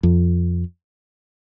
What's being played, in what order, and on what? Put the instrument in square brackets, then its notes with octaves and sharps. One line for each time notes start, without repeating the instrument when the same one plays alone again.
[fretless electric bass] F2